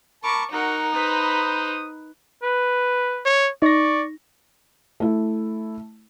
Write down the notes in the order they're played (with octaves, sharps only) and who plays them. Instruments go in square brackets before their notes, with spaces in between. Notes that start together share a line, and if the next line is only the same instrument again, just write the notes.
[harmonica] A#4 A5 [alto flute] B5 [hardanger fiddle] C#6 [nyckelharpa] D6
[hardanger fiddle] D#4 [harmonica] F#4 [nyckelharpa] A#4 F#5 [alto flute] A#5
[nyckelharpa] B4 B5 [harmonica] C5 D#6
[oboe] B4
[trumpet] C#5
[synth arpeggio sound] D#4 A#6 [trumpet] D5 [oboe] C#6
[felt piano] A3 E4